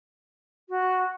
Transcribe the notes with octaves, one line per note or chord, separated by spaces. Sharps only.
F#4